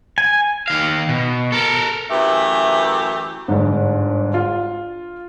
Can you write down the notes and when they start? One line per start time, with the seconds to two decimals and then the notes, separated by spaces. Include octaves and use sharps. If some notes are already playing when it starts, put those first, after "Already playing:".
0.18 G#5
0.68 D#3 F5
1.09 B2
1.52 A4 A#4
2.10 F#2 E3 A3 G4 B4 E5
3.48 G1 G#2
4.34 F4